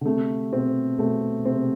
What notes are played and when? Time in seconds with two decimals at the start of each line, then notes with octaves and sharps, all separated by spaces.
0.01 D3
0.05 C3 A3
0.52 B2 C4
0.99 B2 A3
1.45 C3 C4